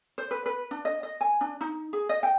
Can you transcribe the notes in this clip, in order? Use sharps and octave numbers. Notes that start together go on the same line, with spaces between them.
C5
B4
B4
D4
D#5
D#5
G#5
D4
D#4
G#4
D#5
G5